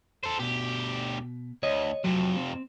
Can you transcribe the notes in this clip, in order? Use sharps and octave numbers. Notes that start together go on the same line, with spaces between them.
A4 C5
D2 B2 G4
D2 C#5 D#5
F2 C3 F#3
C4